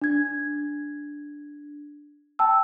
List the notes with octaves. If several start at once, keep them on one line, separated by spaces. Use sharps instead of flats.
D4 G#6
G5 A5 E6